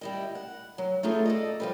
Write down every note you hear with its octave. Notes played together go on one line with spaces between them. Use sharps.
G3 E4 D#5
F#5
F#3
A3 B3 D#4 F4 G#4 A4
A4 D5 D#5
F3 G3 B4